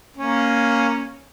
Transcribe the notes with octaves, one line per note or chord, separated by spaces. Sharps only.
A#3 C#4